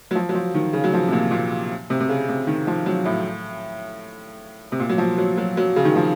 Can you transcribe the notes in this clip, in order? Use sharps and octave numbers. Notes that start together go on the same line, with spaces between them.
F#3
F3
F#3
F3
D#3
C#3
F#3
F3
C3
A#2
A#2
C3
C3
C#3
C3
D#3
F3
F#3
A2
C3
A#2
F#3
F3
F#3
F#3
F#3
C#3
D#3
F3